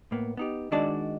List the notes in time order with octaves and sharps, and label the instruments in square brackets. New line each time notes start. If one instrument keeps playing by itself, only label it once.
[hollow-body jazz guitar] A2 A#3 B3
B3 D#4 G4
D#3 G#3 D4 F#4 D5